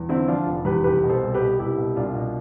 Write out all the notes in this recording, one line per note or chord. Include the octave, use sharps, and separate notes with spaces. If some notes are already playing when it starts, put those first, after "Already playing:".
Already playing: E2
D3 C4 E4
F3 D4 F4
F1
E2 G4 B4
C2 G4 B4
B2
A4 C5
C2
G4 B4
B2
C2 E4 G4
B2
C2 D4 F4
B2